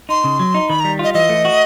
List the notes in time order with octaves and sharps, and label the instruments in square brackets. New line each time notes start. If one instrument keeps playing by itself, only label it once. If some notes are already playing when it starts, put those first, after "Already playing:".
[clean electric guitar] D#4 [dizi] C6
[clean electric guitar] C#3
F#3
D#4
[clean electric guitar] D#3 [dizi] B5
[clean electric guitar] G3 [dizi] A#5
[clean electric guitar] F4 [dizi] D#5
[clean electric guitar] E3 [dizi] D#5
[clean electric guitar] A3
F#4